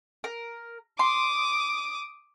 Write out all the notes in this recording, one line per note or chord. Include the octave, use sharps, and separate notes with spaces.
A#4
C6 D6 D#6